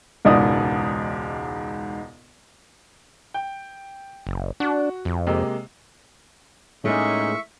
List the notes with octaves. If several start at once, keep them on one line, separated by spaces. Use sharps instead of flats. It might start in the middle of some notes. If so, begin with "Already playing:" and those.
E1 C#2 G#2 D5 D#6
G5
F#1
D4 F#4
F2
C3 G#3 A#3
A2 G#3 A#3 C#4 D#4 G#4 E5 C#6